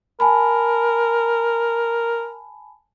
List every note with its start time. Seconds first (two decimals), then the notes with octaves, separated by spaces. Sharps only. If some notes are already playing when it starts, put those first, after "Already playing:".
0.20 A#4 G#5 A5 B5